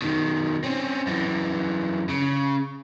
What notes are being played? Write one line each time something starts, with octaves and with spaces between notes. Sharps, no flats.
B2 D#3
C4 C#4
F#2 E3
C#3